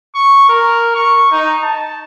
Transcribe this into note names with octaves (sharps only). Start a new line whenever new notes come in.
C#6
A#4
C#6
D#4
A5